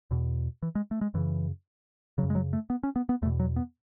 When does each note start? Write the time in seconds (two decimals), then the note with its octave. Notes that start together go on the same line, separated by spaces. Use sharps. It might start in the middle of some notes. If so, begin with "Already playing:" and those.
0.11 E2 B2
0.63 E3
0.75 G#3
0.91 A3
1.01 G#3
1.14 F#2 C#3 E3
2.18 C#3 F#3
2.23 F#2
2.30 G#3
2.35 F#3
2.53 A3
2.70 B3
2.83 C#4
2.96 B3
3.09 B3
3.22 E2 A3
3.26 B2
3.40 F#3
3.56 B3